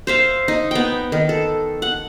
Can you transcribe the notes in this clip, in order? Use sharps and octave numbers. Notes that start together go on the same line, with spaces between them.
C5 E5 F5
D#4
B3 G5
D#3
A4
F#5